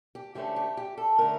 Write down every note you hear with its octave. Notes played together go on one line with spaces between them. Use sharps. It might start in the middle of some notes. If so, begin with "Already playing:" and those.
G4
D2 D3 A3 C#4 G4
G4
G4
A4
D3 A3 C#4 A#4